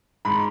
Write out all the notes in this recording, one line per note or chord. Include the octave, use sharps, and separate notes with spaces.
G#2 B5